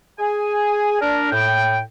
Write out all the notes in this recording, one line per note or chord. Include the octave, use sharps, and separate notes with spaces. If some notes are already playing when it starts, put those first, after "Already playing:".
G#4 G#5
D4 A#4
A2 G5